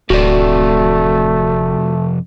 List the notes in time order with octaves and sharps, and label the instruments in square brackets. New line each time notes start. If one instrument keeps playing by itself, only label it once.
[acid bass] D1 [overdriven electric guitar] F2 C3 [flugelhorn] A3 [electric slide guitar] F#4 D5